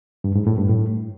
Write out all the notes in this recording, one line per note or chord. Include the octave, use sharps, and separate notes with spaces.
G2
G#2
A2
G2
A2